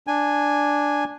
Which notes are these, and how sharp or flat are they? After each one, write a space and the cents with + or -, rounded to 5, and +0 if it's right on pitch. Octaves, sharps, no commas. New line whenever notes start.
D4 +0 G#5 -5